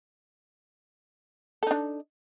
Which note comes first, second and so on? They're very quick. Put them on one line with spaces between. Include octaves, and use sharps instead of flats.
A4 D#4 D4